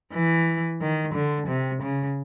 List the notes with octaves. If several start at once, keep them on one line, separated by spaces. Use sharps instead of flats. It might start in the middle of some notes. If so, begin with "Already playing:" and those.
E3
D#3
D3
C3
C#3